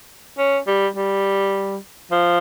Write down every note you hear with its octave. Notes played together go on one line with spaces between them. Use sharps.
C#4
G3
G3
F3